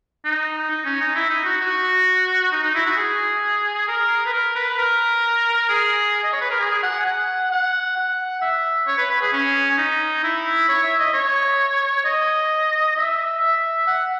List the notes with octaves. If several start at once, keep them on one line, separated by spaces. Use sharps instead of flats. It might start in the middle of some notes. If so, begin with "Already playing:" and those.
D#4
D#4
C#4
D#4
E4
D#4
F#4
F#4
D#4
D#4
E4
F#4
G#4
A#4
B4
A#4
B4
A#4
G#4
D#5
C#5
B4
A#4
G#4
F#5
G#5
F#5
F#5
F#5
E5
C#5
B4
B4
G#4
C#4
C#4
D#4
E4
C#5
E5
D#5
C#5
D#5
E5
E5
F#5